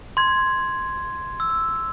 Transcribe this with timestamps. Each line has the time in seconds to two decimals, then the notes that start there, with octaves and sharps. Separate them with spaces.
0.17 C6 G#6
1.40 E6